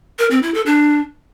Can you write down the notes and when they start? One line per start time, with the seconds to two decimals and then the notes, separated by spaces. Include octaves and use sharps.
0.19 A#4
0.31 C4
0.42 E4
0.54 A4
0.66 D4